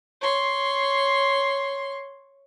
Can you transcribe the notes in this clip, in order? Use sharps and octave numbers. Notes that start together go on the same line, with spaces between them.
C#5 C6